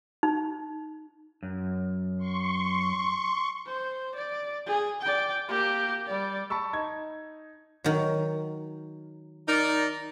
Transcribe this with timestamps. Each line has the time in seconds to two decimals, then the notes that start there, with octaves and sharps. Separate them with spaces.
0.23 D#4
1.43 F#2
2.17 C6 C#6
3.66 C5
4.15 D5
4.66 G#4
5.01 D5 G5
5.48 A#3 G4
6.07 G3 D5
6.50 A5 B5 C#6 E6
6.73 D#4 G#6
7.84 D#3 F#3
9.47 D#4 A#4 D5